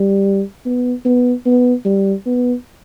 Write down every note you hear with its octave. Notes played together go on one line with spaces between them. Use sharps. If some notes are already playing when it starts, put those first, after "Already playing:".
Already playing: G3
B3
B3
B3
G3
B3